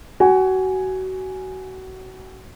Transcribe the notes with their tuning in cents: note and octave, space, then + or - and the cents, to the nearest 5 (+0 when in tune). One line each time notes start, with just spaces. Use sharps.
F#4 +25 G#5 +0